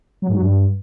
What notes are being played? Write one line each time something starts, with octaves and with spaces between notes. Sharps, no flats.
F#3
G#2
F#3
G2